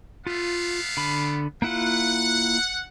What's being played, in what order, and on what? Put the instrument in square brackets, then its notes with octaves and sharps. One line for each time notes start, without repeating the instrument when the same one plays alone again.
[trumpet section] A3 B3 F5 [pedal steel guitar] F4
[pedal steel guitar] D3 B5
[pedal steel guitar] A#3 E4 F4 [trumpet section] F#5